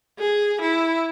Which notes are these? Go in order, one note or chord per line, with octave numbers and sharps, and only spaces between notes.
G#4
E4